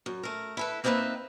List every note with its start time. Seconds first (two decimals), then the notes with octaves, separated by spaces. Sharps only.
0.06 F#2
0.23 A3 A#4
0.57 E4 A4 B4
0.84 A#3 C4 D#4 G4 B4 E5